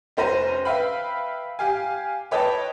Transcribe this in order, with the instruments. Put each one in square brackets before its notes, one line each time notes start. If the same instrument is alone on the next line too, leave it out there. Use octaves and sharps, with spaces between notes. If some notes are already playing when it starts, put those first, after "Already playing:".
[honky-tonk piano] F1 C#4 C5 A#5 A#6 D#7
B4 E5 F5 G5 B5
G4 F5 G#5
B4 C#5 D#5 G5 A5